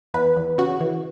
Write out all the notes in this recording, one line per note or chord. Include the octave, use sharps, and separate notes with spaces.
E2 B4
E2
C#3 F#4
E3